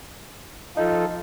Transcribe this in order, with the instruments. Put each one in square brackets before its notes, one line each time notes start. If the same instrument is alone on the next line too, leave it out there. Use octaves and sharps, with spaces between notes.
[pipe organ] F3 F4 A4 [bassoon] D#4